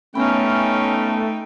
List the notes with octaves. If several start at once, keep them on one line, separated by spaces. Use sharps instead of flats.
A3 B3 C#4 D#4 G5 B5